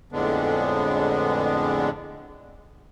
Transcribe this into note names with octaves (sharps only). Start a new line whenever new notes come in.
F2 A2 D3 G#3 B3 D4